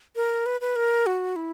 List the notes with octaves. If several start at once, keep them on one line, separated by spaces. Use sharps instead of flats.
A#4
B4
B4
A#4
F#4
E4